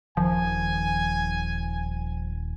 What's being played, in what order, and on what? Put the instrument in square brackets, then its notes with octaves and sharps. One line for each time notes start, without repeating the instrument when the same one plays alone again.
[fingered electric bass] D#1 D#3 [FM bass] F3 [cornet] G#5